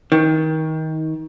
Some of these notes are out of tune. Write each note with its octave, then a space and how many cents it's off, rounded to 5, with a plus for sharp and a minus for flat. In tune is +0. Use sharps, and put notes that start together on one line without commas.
D#3 +25